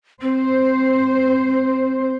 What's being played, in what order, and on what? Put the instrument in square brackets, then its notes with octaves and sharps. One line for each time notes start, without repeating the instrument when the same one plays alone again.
[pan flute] C4 [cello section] C5